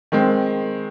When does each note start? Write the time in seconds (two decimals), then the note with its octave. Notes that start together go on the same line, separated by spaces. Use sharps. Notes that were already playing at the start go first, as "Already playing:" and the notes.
0.12 D#3 G#3 C4